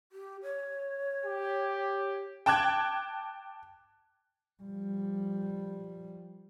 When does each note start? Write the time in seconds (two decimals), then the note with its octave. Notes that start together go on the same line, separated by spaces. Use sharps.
0.12 G4
0.43 C#5
1.25 G4
2.46 G5 A5 D6 F#6 G#6
4.63 F3 G3